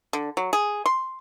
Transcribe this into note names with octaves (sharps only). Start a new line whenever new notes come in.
D3
F#3
G#4
C6